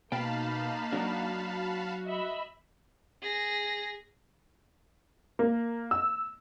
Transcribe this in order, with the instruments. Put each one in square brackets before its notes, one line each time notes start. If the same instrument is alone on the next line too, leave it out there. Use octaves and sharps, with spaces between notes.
[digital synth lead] B2 [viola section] A#3 D#4 [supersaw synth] F5 A5 B5 [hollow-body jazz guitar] G5
[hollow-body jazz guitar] F#3 D4 [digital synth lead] F#4
[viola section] D#5 E5 B5
[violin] G#4 A#6
[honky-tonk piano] A#3
E6